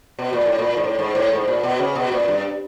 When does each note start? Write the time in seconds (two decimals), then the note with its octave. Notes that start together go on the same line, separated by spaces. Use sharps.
0.19 B2
0.33 A#2
0.46 A2
0.58 A#2
0.77 G#2
0.84 A2
0.99 G#2
1.15 A2
1.32 G#2
1.48 A#2
1.63 B2
1.79 C#3
1.95 B2
2.11 A#2
2.28 G2